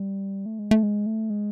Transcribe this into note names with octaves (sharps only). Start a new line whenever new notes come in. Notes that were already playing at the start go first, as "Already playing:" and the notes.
Already playing: G3
A3
G#3
A3
G#3
A3
G#3